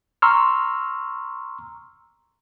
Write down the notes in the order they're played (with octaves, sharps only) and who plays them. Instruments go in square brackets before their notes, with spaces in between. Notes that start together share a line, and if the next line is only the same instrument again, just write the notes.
[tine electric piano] A#5 C6 C#6 E6 F6